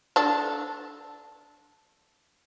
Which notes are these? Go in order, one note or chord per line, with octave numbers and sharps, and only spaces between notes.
D4 A4